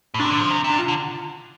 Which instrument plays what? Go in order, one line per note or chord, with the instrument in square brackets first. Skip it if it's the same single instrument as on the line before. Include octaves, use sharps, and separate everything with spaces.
[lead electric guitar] A2
[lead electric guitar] C3 [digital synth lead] D4
[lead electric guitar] D3
F3
C3
C3
[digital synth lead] D4
F4
[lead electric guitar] D3